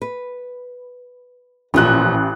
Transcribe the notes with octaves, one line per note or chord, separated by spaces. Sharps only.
B4
A1 A#2 F3 F4 F#6